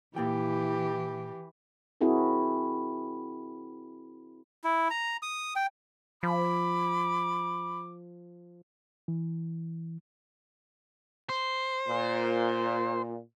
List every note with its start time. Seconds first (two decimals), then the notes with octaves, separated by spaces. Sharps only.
0.16 A#2 E3 A#3 E4 G4 G5
2.01 C4 E4 F#4 G#4 A#4
4.64 E4
4.90 A#5
5.23 D#6
5.56 G5
6.23 F3 B5 D6
9.08 E3
11.29 C5
11.88 A#2